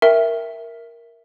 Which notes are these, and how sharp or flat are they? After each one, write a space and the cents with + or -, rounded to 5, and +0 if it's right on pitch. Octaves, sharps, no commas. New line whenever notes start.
A#4 +0 E5 +0 G5 +0